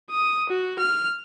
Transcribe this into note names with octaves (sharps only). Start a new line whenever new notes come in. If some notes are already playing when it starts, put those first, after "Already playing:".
D#6
F#4
F6